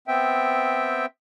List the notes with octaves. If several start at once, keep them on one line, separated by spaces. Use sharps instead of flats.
B3 C4 E5 G5